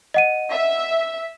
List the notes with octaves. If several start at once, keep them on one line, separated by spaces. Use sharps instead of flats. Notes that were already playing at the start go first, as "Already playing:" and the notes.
D#5 F#5 D#7
E5